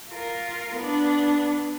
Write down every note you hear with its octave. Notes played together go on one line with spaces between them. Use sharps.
F4 A#4
B3 D4